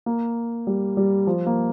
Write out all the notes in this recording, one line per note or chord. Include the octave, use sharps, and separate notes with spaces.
A#3
G3
G3
F3
A#3